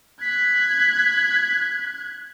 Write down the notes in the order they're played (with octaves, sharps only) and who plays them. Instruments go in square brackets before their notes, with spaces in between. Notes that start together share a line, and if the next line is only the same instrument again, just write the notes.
[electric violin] F#6 G#6 [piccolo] B6